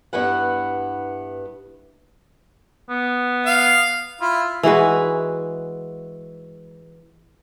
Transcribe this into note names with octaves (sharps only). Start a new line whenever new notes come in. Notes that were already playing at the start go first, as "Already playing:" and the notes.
G2 B3 E4 B4 F#5
B3
F5
E4 F4
E3 G#3 F#4 B4